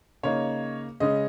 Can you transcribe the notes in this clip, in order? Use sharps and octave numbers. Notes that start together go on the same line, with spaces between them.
C#3 A#3 D#4 C#5
C#3 G#3 C#4 D#5